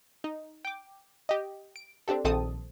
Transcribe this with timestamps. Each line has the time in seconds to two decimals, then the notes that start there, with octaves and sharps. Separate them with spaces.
0.24 D#4
0.65 G5 D6
1.29 G4 D#5
1.76 D7
2.08 C4 D4 G4 A4
2.24 A#1 D#3 C4 A4 A5 D#6